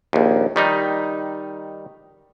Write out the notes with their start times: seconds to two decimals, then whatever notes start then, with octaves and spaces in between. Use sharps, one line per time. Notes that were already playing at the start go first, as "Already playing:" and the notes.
0.13 A#1 D#2
0.56 D#3 G3 D#4